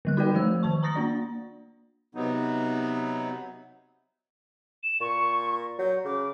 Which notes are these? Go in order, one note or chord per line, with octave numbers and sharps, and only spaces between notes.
D3 G3 F#6
D#4 F#4 A#4 B4 D5 G5
F3 A3 C5 E6
D#3 C5 A5 C#6
A#5 C#6 D#6 A6 A#6
A#3 D4 D5
C3 F#3 B3 D#4
E7
A#2 C#6
F#3 G6
C#3 D6